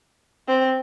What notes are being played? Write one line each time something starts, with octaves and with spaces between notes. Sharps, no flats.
C4